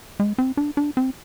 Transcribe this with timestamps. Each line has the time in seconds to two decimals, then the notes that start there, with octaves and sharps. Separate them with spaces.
0.20 G#3
0.38 C4
0.57 D4
0.77 D4
0.97 C4